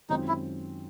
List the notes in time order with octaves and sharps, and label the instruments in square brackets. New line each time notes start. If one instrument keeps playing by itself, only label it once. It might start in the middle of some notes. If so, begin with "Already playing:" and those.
[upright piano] F#2 D#3 G#3 C4 F4 [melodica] D#4
[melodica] E4